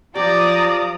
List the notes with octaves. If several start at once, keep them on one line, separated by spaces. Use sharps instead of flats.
F3 G4 D5 A#5 D#6